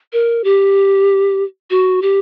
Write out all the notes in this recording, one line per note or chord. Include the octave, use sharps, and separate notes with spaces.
A#4
G4
F#4
G4